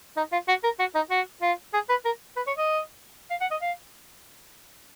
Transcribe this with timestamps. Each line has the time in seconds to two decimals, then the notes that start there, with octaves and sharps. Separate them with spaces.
0.17 D#4
0.32 F4
0.49 F#4
0.64 A#4
0.80 F#4
0.95 D#4
1.11 F#4
1.42 F4
1.74 G#4
1.90 B4
2.05 A#4
2.37 B4
2.47 C#5
2.58 D#5
3.30 F5
3.41 F#5
3.51 D#5
3.62 F5